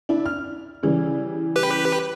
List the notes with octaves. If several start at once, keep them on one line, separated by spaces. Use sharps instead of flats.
D4 E4
F6
C#3 E3 G3
G4 B4